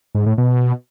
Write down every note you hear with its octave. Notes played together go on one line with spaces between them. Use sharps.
G#2
A2
B2